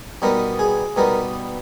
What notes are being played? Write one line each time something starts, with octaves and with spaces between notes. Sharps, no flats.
B2 G3 B3 D#4 A#4
G#4
B2 G3 B3 D#4 A#4